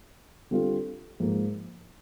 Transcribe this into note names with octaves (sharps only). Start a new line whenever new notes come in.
D3 G3 C4 F4
G#2 F3 A#3